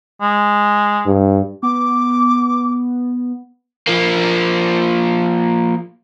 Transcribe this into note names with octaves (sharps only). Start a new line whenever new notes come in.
G#3
G2
B3 D6
F3 A#3